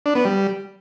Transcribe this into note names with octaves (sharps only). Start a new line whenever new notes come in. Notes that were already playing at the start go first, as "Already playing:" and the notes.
D4
B3
G3